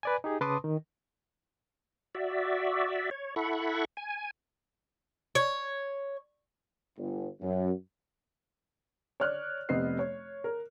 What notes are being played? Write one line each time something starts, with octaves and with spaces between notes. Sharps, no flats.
B4 D5 G#5
D#4 G4 G#4
C#3 B4 A5 C6 D6 D#6
D#3
F#4 D5 E5
C#5
E4 A4 F#5 B5 C#6
G#5
C#5
G1
F#2
C#5 D5 F6 F#6
F1 C3 B3 D#5 C7
C#5
A#4